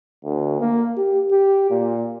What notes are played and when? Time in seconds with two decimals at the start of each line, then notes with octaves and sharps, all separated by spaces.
0.24 D2
0.61 A#3
0.97 G4
1.31 G4
1.70 A#2